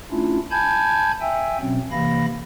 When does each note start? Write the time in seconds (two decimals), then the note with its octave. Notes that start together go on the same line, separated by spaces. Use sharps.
0.11 A3 C#4 D4 E4 F4
0.51 G#5 A5 B5 G6 G#6
1.20 E5 G5 G#5 E6
1.60 B2 F#3 C4 C#4
1.91 C3 E3 A#3 F5 B5 A#6